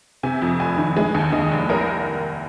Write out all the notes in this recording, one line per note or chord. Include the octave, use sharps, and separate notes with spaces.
C3 G#5
F2
F1 G#5
D#3
G#3 G#5
D#2
D#2 D#5
F1
C2 A#4